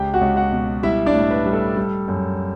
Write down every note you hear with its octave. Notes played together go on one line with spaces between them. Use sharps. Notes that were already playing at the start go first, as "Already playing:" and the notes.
Already playing: C#2 G4 G5
F#4 F#5
C#2
F#4 F#5
B2
G3 E4 E5
D4 D5
A2
B4
G3
A4
G3
F#2